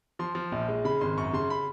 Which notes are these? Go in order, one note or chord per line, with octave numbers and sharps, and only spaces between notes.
F3 C6
F3
A#1
G#3
C#3 B5
G#1 C6
F#2 C#6
C#3 C6
B5